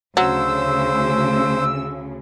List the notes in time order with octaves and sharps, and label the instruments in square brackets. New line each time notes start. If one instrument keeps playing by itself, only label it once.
[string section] D2 C#3 [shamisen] F#3 [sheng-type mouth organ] C5 [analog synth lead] E6